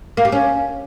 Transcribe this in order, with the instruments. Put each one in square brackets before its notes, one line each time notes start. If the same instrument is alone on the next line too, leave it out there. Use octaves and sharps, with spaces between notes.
[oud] A#3
G4
C#4